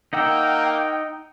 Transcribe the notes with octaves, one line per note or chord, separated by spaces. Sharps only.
A#3 D#4 F#5 G5 E6